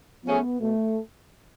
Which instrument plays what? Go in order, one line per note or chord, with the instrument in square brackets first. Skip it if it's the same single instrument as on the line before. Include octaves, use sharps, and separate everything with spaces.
[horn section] F3 A3 C#4 G#4 [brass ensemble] B3
[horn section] B2 [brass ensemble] A3